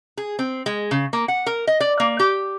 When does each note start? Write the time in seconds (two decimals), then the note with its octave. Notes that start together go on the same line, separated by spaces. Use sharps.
0.17 G#4
0.39 C4
0.66 G#3
0.91 C#3
1.13 A#3
1.28 F#5
1.46 A#4
1.67 D#5
1.80 D5
2.00 A#3
2.20 G4